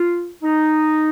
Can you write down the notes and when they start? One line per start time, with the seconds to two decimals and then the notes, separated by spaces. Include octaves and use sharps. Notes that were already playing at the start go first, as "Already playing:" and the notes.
Already playing: F4
0.43 D#4